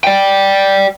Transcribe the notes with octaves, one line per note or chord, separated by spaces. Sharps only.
D5 G5